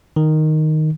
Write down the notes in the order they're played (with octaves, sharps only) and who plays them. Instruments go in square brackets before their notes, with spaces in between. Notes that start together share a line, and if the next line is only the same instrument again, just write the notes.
[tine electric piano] D#3